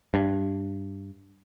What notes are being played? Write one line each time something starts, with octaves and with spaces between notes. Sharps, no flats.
G2